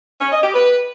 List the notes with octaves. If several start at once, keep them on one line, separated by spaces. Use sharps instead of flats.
C#4
D#5
G4
B4